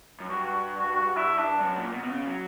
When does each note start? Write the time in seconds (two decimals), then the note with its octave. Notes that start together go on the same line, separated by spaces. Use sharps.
0.20 F#2
0.30 G2 F#4
0.45 F#4
0.79 F#4
0.95 F#4
1.17 E4
1.38 D4
1.60 F#2
1.76 A#2
1.93 B2
2.03 B2
2.09 C#3
2.26 F#3